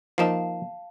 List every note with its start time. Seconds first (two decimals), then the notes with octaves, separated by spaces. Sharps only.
0.18 F3 A#3 D#4 F5 A5